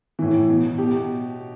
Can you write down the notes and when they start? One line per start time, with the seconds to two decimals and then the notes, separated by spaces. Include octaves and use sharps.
0.19 A2 E3
0.49 B2
0.78 B2 G4